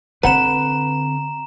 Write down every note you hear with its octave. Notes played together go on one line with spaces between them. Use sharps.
D3 C4 B4 F#5 A#5 E7